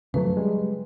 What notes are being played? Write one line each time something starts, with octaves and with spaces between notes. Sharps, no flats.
F#2 C#3 F3 F#3 A3 B4
G3 G#3